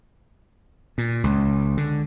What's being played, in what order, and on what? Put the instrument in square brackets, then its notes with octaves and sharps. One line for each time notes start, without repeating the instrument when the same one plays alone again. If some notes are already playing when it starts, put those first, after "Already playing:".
[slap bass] A#2
C#2
D3